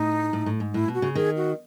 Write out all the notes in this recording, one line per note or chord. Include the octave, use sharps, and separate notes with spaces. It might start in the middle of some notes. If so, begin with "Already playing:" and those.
Already playing: A2 D#4
A2
A2
G#2
A2 E4
B2
F#4
C#3
D#3 G#4
F#4